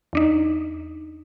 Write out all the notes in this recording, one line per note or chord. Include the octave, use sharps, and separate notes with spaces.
E2 D4 D#4